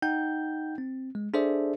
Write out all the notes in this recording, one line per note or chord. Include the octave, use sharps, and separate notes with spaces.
D#4 F#5 G5 G6
C4
G#3
D4 G#4 A4 C5 D5 E5